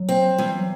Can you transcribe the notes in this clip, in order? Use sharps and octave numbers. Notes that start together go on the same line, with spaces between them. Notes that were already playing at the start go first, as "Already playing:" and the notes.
Already playing: F#3
C4
F#3
E2 G3
F#3